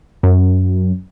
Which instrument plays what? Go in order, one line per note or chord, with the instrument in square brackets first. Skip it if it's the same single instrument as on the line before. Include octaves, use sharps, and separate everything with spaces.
[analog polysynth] F#2